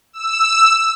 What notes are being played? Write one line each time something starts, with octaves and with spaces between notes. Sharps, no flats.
E6